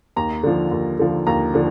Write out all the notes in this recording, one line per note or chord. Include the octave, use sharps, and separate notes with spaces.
D#2 A#5
D3 F3
D#2
D3 F3
D#2 A#5
D3 F3